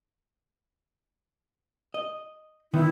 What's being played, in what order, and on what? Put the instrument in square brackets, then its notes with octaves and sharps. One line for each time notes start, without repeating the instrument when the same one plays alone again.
[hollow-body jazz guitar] D#5
[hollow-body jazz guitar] D3 D#3 B3 [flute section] E4